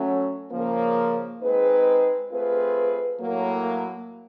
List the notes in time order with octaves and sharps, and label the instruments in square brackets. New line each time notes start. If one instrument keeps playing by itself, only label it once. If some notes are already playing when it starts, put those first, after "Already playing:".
Already playing: [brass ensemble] F#3 A3 C#4
C#3 F3 A#3
G#3 C4 D#4 G#4 B4
A3 C4 F4 G#4 B4
A2 F#3 A#3